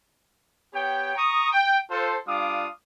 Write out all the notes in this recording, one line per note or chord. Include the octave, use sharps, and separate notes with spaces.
B3 G4 C#5 G5
A#5 C#6 D#6
G5
F4 A4 C5
G3 D4 F4 F5 D6 D#6